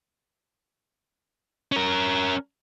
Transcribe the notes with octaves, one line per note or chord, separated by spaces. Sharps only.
C#4 A#4